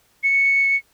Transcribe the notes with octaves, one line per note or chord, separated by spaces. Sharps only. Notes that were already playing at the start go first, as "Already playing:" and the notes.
C#7